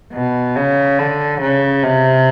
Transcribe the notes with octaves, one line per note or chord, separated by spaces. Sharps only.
B2
C#3
D3
C#3
C3